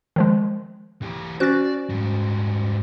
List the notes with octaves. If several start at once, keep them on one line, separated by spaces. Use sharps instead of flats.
D#3 F3 G#3
E3 G4
C#4 F#4 C5 D5 F#6 A6
G#2 G3